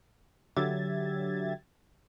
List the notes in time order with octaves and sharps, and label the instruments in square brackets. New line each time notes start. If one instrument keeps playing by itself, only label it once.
[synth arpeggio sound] D3 F#3 G4 E5 G#6 A6